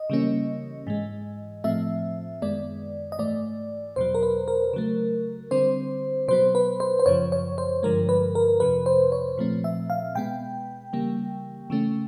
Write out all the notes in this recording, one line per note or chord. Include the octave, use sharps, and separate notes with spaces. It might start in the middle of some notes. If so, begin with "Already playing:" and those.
Already playing: D#5
C#3 E3 G3 A#3 C#4
G#2 E3 G#3
A2 F3 A3 C4 E5
F#2 D#3 G#3 B3 D5
D#5
G#2 E3 A3 D5
E2 B2 F#3 C5
A#4
B4
A#4
C#3 F#3 A3
D3 G3 C4 C5
B2 F#3 B3 C5
B4
C5
C5
F#2 C#3 F3 C#5
C#5
C5
G2 D3 F3 G#3 A#4
B4
A#4
F2 C3 F3 B4
C5
C#5
A#2 F3 A3 C4
E5
F5
B2 G#3 B3 G5
C#3 E3 G3 A#3
C#3 E3 A3 C#4